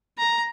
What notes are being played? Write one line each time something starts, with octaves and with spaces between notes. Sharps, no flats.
A#5